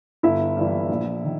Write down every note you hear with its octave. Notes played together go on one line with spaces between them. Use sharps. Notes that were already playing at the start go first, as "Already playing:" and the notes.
G1 E4 E5
G2 E3
A#1
D#3